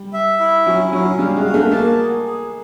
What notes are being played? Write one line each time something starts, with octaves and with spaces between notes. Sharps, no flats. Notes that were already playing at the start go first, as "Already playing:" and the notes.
Already playing: G3
E5
E4
F#3 C#4
F#3 C#4
G3 F5
G#3
F#4
A3
A#3 A5
G#4
G#4